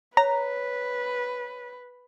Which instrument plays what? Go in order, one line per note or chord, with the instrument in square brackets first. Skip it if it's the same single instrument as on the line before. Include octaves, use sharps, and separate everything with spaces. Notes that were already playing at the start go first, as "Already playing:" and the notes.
[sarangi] B4 [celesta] C#5 [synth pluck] A#5